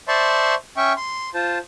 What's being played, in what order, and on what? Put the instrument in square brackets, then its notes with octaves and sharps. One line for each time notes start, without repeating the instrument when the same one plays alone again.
[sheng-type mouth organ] C5 D5 E5 A5 C6 C#6
C#4 E5 G5 C#6
C6
F4 C5 A5